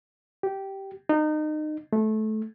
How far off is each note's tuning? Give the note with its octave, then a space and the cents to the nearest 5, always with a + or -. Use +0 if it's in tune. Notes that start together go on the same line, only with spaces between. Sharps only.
G4 -10
D#4 -30
A3 -20